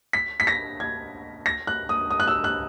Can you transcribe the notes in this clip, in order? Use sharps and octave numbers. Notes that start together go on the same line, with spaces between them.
B6
B6
A#6
G#6
A#6
F#6
D#6
D#6
F#6
E6
F#6